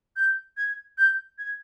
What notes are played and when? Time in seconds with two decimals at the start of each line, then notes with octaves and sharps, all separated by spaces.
0.16 G6
0.58 G#6
0.98 G6
1.39 G#6